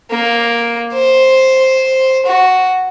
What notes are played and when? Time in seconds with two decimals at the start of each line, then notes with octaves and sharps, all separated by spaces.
0.11 A#3
0.93 C5
2.26 F#4